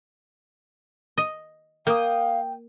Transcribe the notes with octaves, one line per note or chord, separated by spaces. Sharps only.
D#5
A#3 F5 G5 D#6